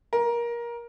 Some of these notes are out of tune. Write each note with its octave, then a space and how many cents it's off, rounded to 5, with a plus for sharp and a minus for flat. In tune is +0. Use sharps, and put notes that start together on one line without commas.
A#4 +20